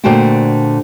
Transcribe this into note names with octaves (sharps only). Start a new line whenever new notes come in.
A#2 D3 A3 F#4 C5 G5